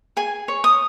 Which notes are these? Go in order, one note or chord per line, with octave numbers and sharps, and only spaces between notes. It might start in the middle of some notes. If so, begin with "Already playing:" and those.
G#4 G#5
C#5
D#6